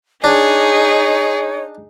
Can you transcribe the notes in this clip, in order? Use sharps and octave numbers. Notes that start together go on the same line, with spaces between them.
D4 D#4 G#4 C#5